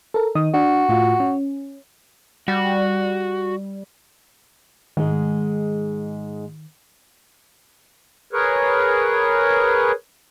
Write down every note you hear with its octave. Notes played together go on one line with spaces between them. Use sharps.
A4 A#4
D#3 D#5 D#6
D4 F#4
A2 F4
C#4
G3 F#4
G#2 D#3 G#3
G#4 A#4 B4 C#5